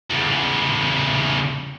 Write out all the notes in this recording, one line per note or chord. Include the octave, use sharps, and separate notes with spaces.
E2 C#3